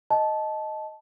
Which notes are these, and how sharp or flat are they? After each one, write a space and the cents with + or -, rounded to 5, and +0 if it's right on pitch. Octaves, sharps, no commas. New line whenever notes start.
D#5 +0 A5 -15